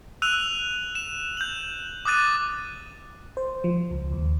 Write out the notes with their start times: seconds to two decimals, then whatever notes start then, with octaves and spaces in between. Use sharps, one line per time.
0.22 E6 F#6 D#7 F7
0.95 E7
1.37 G6 F#7
2.05 D6 D#6 F#6 A6 D#7
3.37 C5
3.64 F3
3.91 C#2
4.11 D#2